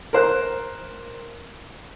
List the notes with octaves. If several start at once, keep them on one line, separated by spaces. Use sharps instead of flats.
A#4 C5 F#6